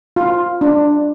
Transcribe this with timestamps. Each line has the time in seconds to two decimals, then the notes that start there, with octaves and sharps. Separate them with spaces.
0.16 F4
0.61 D4